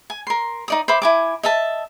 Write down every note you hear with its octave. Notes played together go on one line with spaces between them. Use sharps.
G#5
A#4 C6
D#4 D5 D#6
C5 E5 B5 D6
E4 G#5 D6
D#5 E5 A5